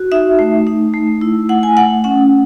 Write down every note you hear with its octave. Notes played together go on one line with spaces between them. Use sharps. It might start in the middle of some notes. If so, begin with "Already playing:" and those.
Already playing: F#4
D#4 E5
A3
D#4
A3
E4
A3 F#5
G#5
A3 F#5
C#4 F#5